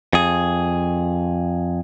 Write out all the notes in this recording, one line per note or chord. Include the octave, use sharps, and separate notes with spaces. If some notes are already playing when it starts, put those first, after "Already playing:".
F2 G#4